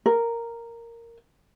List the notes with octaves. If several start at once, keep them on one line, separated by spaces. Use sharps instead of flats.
A#4